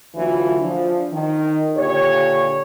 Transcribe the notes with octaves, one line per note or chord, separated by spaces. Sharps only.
D2 D3 E3 F#3 F4
F3 D4
D#3
A#2 D3 G4 C#5